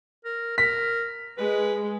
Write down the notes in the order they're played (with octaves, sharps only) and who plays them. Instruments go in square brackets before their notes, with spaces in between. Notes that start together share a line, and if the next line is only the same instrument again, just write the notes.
[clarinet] A#4
[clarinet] A#4 [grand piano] B6
[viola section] G#3 [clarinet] B4